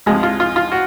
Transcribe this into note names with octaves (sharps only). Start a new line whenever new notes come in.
C#2 C3 F3 G#3
F4
F4
F4
F#4